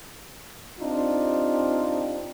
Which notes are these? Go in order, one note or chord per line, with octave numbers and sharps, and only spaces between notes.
C4 D4 D#4 F4 G4